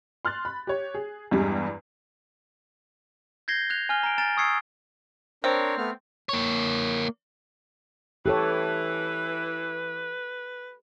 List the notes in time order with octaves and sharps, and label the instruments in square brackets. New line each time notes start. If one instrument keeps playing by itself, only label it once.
[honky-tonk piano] C6 F6 F#6 A6
B5
G4 C#5
G#4
E2 G2 G3 G#3
[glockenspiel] G6 G#6 A#6 C7 G7
F#6 G#6 F7
G#5 F6 G7
A#5 D7
G#5 A#5 F6 A6 D7 E7
C#6 D#6 E6 G#6 C7 C#7
[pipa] C4 [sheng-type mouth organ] D4 A#4 C#5
[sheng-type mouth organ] A3 B3 F6
[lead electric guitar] A#3 C#5
[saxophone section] E3 [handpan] G4 A4 C#5 [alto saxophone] B4